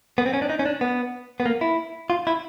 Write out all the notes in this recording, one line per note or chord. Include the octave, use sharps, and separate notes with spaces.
B3
C4
C#4
D4
D#4
C#4
D4
B3
B3
A#3
E4
F4
E4